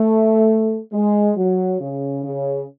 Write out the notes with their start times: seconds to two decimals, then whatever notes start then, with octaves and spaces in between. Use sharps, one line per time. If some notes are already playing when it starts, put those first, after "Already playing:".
Already playing: A3
0.93 G#3
1.37 F#3
1.80 C#3
2.24 C#3